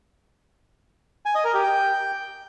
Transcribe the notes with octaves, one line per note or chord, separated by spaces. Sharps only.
G#5
D#5
A#4
G4
G5